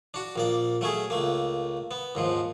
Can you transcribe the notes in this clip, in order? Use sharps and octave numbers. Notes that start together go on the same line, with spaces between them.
D4 F#4
A#1 A#3 D5
F#3 A3 C#4 G#4
C#2 A3 A#3
B3
D#2 G#2 F3